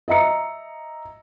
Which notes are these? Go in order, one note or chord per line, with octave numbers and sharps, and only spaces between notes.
D#5 E5 A#5 C#7